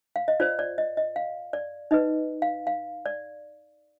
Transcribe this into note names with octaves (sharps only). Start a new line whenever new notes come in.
F5
D#5
F4 C5 D5
D5
D#5
D#5
F5
D5
D#4 B4 D#5
F5
F5
D5